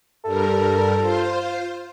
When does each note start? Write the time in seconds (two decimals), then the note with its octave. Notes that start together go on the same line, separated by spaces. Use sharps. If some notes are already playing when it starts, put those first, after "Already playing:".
0.24 G2 G3 A4 A#4
0.97 F4 C5